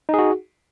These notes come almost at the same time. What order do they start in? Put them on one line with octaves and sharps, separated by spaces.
D#4 G#4 F#4